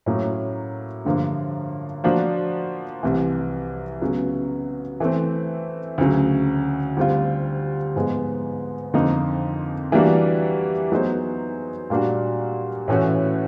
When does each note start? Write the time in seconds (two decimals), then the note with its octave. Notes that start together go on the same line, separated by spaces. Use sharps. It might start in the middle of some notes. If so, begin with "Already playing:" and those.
0.06 A2 F#3 A#3 C#4
1.05 G2 D3 F3 A#3
2.04 F3 A#3 D4 F#4
3.03 C2 C3 E3
4.02 C#3 F#3 B3
5.00 E3 A3 C4
5.98 D2 C#3 F#3
6.97 D2 D3 G3 C4 F4
7.96 G#2 F3 G#3 B3
8.94 F2 D3 F3 A#3 D#4
9.92 E3 G3 A#3 D4 F#4
10.92 F#3 B3 D#4 G#4 C5
11.90 A#2 G3 A#3 D4 F#4
12.88 A2 E3 A3 C#4 F#4